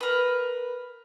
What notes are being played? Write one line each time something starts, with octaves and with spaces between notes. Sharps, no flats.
A#4 B4